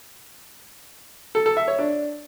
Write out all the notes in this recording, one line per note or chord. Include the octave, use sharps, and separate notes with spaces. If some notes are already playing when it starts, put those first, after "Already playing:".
A4
A4
E5
C#5
D4